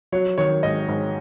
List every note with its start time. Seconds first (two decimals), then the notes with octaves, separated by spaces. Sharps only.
0.12 F#3 C#5
0.38 D#3 C#5
0.63 G#2 D#5
0.88 G#2